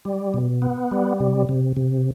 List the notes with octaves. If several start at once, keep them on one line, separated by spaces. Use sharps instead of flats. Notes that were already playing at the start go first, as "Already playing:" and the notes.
G3
B2
B3
G3
C3
C3
C3